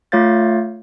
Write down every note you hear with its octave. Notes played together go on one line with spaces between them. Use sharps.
A3 F4 C#5 F5 G6 A6